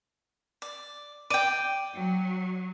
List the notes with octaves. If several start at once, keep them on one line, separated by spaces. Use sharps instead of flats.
D5
D5 G5 D#7
F#3